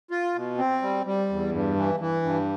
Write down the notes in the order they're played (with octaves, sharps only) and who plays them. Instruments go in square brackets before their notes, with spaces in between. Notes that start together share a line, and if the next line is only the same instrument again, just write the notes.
[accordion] F4
B2
C4
G3
G3
E2
G2
E3
E3
G2